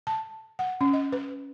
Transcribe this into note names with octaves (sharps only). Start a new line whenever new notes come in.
A5
F#5
C#4
D#5
B4